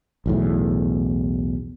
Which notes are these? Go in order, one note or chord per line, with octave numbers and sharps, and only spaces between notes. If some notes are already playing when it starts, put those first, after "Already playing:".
B1 E2 A2